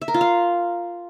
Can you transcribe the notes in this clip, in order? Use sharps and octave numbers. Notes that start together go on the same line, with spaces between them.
E5
A#4
F4
F5